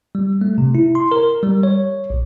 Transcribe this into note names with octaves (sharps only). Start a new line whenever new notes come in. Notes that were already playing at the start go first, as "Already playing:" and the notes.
G3
A3
C3
E4
C6
A#4
G3
C#5
A#1